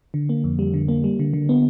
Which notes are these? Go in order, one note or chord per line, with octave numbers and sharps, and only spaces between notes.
D3
A#3
F2
G3
D3
A#3
G3
D3
D3
B3